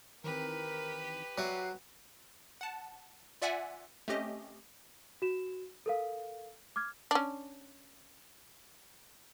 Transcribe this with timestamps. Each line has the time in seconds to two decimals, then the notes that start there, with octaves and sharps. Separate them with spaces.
0.24 D#3 E3 C4 G4 A#4 B4
1.38 F#3 F#4 D5 E5 C7
2.61 F#5 A5
3.42 F4 D5 E5 F#5 G#5
4.08 A3 C4 C#4 G4 D#5
5.22 F#4 E7
5.86 A4 A#4 F5
6.76 D6 F6 G#6
7.11 C#4 D4